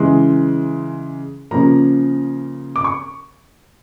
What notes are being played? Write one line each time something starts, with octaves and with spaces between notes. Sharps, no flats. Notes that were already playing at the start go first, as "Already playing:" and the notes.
Already playing: C#3 E3 G#3 C6
C#3 F3 A#3 A#5
D6
C#6